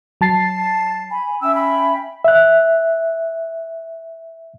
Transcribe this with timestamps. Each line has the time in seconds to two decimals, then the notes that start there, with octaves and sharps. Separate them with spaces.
0.21 F#3 A5 A6 C7
1.11 G#5 B5
1.41 C#4 E5 G5 E6
1.55 B5
2.24 E5 F#6